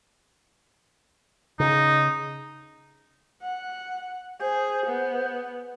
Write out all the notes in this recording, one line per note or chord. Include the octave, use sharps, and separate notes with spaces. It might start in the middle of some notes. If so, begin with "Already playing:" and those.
C#3 D#4
F#5
G#4 C5
B3